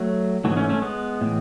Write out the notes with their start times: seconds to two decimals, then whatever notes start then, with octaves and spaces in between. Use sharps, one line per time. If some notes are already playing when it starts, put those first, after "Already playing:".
Already playing: F#3 A3
0.44 G#2 E3 F#3 A3
0.52 B3
0.57 A3 C#4
0.69 A3 C#4
0.82 G#3 B3
1.21 A2 E3